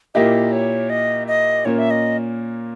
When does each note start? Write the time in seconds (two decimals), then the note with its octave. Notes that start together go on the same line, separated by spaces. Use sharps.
0.15 A#2 A#3 E4 G4 D#5
0.52 C#5
0.90 D#5
1.27 D#5
1.65 A#2 A#3 C#4 C#5
1.78 E5
1.90 D#5